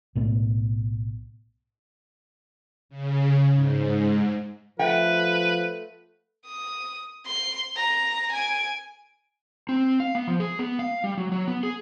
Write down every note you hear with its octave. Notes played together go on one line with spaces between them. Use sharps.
B1 A2 B3
C#3
G#2
F3 A3 B4 F#5 G5
D#6
C6
A#5
G#5 D7
C4
F5
B3
F3
G#4
B3
F5
G3
F#3
F#3
B3
G#4